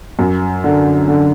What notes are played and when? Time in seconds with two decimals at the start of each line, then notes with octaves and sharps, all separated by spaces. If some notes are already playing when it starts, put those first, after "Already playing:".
0.19 F#2
0.64 D3
1.08 D3